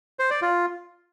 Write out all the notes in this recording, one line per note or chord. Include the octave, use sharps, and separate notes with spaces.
C5
D5
F4